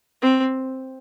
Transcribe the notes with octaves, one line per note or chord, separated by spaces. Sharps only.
C4